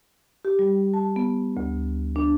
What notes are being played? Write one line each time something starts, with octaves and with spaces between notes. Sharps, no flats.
G4
G3
A5
B3
D2
D4